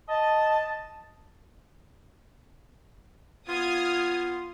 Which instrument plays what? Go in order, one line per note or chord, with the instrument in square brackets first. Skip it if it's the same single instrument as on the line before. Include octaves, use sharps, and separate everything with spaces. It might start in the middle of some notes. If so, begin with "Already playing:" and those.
[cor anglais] D#5 [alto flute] A5
[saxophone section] B3 F4 [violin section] D#6 F6 G#6